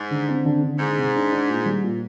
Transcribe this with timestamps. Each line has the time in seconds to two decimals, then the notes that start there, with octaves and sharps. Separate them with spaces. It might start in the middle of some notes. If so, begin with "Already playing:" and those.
Already playing: G#2
0.11 D3
0.29 C4
0.45 D3
0.63 D3
0.79 G#2 D4
0.97 C3
1.14 D4
1.32 D4
1.49 A#2
1.66 G3
1.83 A#2